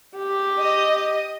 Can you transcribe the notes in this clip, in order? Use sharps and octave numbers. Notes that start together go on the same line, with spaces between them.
G4
D#5